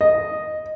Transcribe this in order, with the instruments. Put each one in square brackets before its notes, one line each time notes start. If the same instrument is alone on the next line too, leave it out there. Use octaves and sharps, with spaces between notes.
[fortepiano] D#5